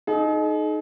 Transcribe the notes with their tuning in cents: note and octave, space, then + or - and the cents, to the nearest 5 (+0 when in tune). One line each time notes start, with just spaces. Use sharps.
D#4 -5 G#4 +45